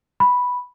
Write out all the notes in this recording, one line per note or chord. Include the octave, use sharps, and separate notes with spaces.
B5